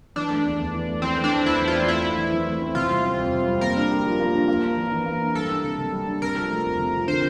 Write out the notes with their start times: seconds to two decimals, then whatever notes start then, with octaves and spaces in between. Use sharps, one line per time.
0.16 E3 D4
0.30 A3
0.45 E2
0.59 E2
0.74 E3
0.88 A3
1.02 E3 C4
1.17 A3
1.24 D4
1.31 E2
1.45 E2 E4
1.60 E3
1.67 F4
1.75 A3
1.88 A3 E4
2.04 C4
2.17 E3
2.32 E3
2.46 A3
2.62 C4
2.75 C3 F4
2.90 G3
3.04 C4
3.18 F2
3.33 C3
3.48 G3
3.61 A#3 A#4
3.76 D4
3.91 G4
4.05 F3
4.20 A#3
4.34 D4
4.48 A#3
4.63 D4
4.77 E3
4.92 E3
5.06 A#3
5.20 D4
5.35 G3 A4
5.49 D4
5.64 C3
5.78 C3
5.93 G3
6.07 D4
6.21 C3 A#4
6.36 F3
6.50 A3
6.65 F2
6.79 C3
6.93 F3
7.07 D3 C5